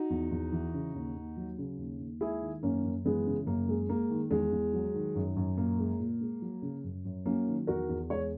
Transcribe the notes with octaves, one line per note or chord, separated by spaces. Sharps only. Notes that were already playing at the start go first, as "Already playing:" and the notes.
Already playing: D#4 F#4
E2
E2
E3
C#3
D#2
D#2
F#3
C#3
D#2
D#2
G#3 E4 G#4
D#3
F#2 A#3 C#4
F#2
E3 G#3 B3
C#3
F#2 A#3
G#3
G#3 A#3
D#3
E2 G#3
E2
F#3
D#3
F#2
F#2
A#2 A#3
G#3
A#2
G#3
F#3
C#3
F#2
F#2
F#3 A#3 C#4
D#3
E2 F#4 A#4
E2
G#3 C#5